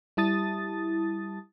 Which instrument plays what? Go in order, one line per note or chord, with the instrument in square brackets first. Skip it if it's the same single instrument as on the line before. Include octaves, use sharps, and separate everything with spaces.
[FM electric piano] G3 E4 A5 D#6 A6